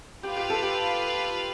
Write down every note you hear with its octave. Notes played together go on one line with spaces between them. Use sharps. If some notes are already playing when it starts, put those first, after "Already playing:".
F4 G4 B4 F5
G4
A4
G4